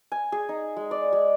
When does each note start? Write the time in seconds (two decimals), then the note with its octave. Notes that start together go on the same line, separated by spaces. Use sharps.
0.12 G#5
0.32 G#4
0.49 D#4
0.77 G#3
0.91 D5
1.13 G#3